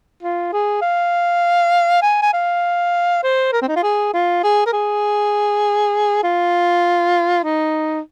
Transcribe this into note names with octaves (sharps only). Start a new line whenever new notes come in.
F4
G#4
F5
G#5
G#5
F5
C5
A#4
C4
D#4
F4
G#4
F4
G#4
A#4
G#4
F4
D#4